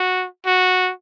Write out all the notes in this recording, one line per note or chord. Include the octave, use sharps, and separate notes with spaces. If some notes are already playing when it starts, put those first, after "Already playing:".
Already playing: F#4
F#4